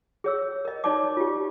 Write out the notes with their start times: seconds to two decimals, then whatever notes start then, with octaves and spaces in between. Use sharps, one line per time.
0.24 G#4 C#5 E6
0.65 A#4 D#5
0.84 D#4 C#5 D5 A5 D6
1.17 F4 G4